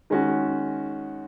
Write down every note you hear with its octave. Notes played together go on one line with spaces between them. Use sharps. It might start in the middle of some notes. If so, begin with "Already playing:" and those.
D#3 G#3 C#4 F#4